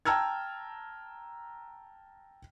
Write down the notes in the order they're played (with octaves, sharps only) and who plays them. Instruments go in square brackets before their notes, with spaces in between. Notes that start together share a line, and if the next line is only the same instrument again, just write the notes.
[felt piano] G5 A5 A#5 E6 F6 G#6